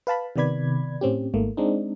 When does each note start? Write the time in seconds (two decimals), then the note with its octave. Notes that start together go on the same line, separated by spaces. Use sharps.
0.07 B4 F5 A5 B5
0.36 C3 D#3 B3 D5 B5 G#6
1.01 A2 C4 C#4 G4
1.34 G#1 G#2 A3 A#3
1.57 G#3 C4 D4 D#4